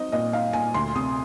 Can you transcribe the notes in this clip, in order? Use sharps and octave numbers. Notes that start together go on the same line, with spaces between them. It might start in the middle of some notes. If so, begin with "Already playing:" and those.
Already playing: C4 D#4 D#5
A#2 D#5
D#4 F5
A#2 G#5
D2 C6
C3 D#6